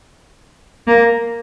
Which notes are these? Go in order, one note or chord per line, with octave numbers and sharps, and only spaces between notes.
A#3